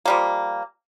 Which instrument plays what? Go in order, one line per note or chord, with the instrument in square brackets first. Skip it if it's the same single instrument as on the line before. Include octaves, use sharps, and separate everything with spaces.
[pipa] F3 G3 A#3